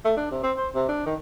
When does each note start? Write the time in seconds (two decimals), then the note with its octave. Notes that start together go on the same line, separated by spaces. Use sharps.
0.05 A3
0.17 D4
0.31 C3
0.43 C4
0.57 C5
0.75 C3
0.89 D4
1.06 D#3